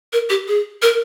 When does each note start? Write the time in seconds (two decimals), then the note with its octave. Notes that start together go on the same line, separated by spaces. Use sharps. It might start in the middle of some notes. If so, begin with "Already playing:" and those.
0.13 A#4
0.30 G4
0.48 G#4
0.82 A#4